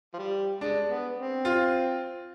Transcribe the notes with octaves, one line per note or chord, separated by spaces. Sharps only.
F3
G3
G#3 D4
B3
C4
F4